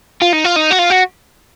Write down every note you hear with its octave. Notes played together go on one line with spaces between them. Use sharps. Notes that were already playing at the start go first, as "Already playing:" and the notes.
F4
D#4
F4
D#4
F#4
F4
F#4